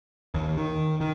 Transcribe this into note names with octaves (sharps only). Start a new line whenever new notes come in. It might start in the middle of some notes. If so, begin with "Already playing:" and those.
D#2
D#3
D#3